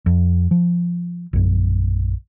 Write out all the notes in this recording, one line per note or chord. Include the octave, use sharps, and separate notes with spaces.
F2
F3
A#1 F#2